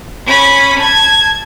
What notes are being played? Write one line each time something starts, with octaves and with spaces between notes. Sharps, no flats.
C#4 B5
A5 G#6